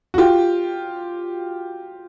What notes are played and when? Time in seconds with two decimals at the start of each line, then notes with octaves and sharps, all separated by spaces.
0.14 F#4
0.18 F4 G4